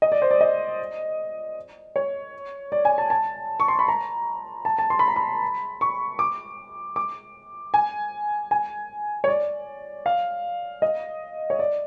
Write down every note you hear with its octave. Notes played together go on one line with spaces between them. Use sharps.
D#5
D5
C5
D5
D#5
C#5
D5
G#5
A5
A5
C#6
C6
B5
A#5
A5
A5
C6
B5
A#5
B5
C#6
D6
D6
G#5
G#5
C#5
D5
F5
D#5
C#5
D5